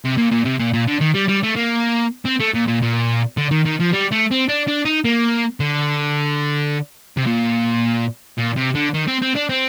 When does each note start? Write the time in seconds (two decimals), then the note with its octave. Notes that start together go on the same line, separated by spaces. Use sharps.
0.05 C3
0.17 A#2
0.31 A#2
0.45 C3
0.59 A#2
0.73 A#2
0.88 D3
1.01 D#3
1.15 G3
1.29 G3
1.44 A3
1.56 A#3
2.26 C4
2.40 A3
2.55 A#2
2.68 A#2
2.82 A#2
3.37 D3
3.51 D#3
3.65 D#3
3.80 F3
3.93 G3
4.11 A3
4.31 C4
4.48 D4
4.68 D4
4.85 D#4
5.05 A#3
5.60 D3
7.17 C3
7.26 A#2
8.38 A#2
8.57 C3
8.75 D3
8.94 D#3
9.08 C4
9.22 C4
9.36 D4
9.49 C4